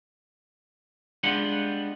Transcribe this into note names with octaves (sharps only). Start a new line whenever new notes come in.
G3 G#3 B3 D4 F4 F#5